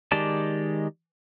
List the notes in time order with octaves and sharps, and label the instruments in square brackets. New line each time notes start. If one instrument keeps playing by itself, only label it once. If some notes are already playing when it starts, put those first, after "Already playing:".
[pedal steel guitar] D#3 G#3 G4 D5 A5